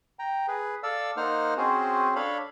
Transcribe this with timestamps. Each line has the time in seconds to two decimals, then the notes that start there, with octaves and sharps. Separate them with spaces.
0.19 G5 A#5
0.48 G#4 B4
0.83 A4 D5 F5 E6
1.17 A#3 D#4 C5 F#5 F6
1.57 C4 C#4 F#4 G#4 C5
2.16 D4 A4 C#5 F5 B5